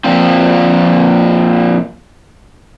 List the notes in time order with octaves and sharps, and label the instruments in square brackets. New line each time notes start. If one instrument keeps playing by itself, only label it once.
[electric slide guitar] A#2 F3 C4